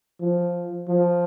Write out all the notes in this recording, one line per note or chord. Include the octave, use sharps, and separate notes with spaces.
F3
F3